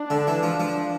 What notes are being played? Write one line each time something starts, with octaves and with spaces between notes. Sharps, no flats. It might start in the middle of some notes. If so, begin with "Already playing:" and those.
Already playing: D4
D3
E3
F3
F3